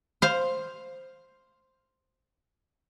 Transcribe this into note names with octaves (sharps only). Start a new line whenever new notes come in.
C5 F5